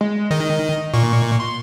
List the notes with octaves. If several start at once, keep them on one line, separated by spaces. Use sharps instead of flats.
G#3
D#3 D#5
A#2 C#6
C6